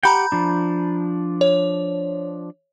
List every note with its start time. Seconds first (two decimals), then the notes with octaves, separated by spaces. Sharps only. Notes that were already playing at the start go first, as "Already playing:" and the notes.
0.03 G4 F#5 G5 A#5 B5 G6
0.32 F3 D4
1.41 C#5